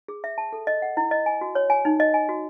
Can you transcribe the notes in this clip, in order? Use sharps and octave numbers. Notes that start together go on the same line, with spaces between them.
G#4
E5
A5
A4
D#5
F#5
E4
D#5
G#5
F#4
C#5
G#5
D#4
D#5
G#5
F#4